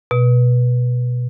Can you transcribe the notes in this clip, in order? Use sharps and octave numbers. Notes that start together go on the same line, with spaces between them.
B2